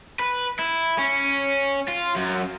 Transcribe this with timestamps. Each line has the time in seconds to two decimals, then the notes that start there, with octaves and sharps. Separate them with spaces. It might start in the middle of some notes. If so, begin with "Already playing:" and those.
0.20 B4
0.59 E4
0.98 C#4
1.88 F4
2.16 F#2